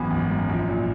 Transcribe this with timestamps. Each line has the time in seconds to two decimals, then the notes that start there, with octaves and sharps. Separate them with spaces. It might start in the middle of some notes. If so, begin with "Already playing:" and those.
Already playing: G#1 F#2 E3 B3
0.10 G#1
0.30 F#2
0.49 A#1
0.68 A#2